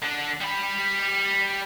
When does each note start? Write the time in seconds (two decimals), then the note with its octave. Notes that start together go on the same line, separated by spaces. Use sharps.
0.02 D3 D4
0.41 G3 B5